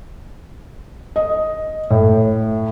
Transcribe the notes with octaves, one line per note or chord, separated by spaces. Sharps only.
D#5
A2